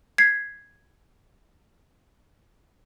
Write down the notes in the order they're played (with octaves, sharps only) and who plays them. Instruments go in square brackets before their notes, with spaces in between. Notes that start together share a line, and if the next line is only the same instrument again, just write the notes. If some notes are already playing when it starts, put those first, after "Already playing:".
[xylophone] G#6 B6 C7